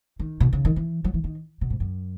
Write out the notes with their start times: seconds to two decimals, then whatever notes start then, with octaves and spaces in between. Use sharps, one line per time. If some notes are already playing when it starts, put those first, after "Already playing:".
0.19 D#3
0.40 B2
0.53 C#3
0.65 D#3
0.76 E3
1.04 F#3
1.14 E3
1.24 D#3
1.61 B2
1.70 G#2
1.80 F#2